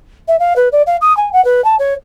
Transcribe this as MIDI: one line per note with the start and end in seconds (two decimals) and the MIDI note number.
0.28 0.38 76
0.39 0.53 77
0.56 0.68 71
0.72 0.82 74
0.86 0.96 77
1.01 1.15 87
1.17 1.32 80
1.32 1.43 78
1.44 1.63 71
1.64 1.75 81
1.79 1.94 73